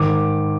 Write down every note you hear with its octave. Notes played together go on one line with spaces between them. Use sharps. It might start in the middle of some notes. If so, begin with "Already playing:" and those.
Already playing: G#2 D#3 D6